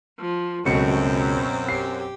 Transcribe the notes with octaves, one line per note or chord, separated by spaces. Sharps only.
F3
C#2 F#2 B2 F#3 A3 C4 C#7
B2
G4 C7